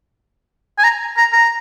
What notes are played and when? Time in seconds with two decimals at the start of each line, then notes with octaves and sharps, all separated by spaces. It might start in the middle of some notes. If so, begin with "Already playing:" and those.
0.79 G#5
0.84 A#5
1.17 A#5
1.33 A#5